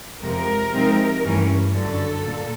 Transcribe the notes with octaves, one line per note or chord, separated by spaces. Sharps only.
F2 C3 F3 G#3 A#4
C3 F3 G#3 C4 D#4
G2 E3 A3 C#4
F#2 D3 F#3 A4
A#2